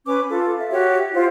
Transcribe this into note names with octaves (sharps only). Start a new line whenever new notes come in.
C#4 B4 D6
F4 A4
E5
F#4 G4 C#5 E5
E4 F4 C5 F5